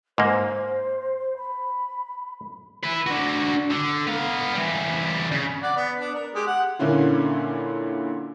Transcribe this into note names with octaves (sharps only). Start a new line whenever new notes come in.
G#2 A#3 C5
B5
E4 B4
D4 F#4
D3
B3 F5
E3 G3
C#3
D5 F#5
B3
D4
A#4
G#3 G4
F#5
A#2 D3 A#3 C#4 E4 F4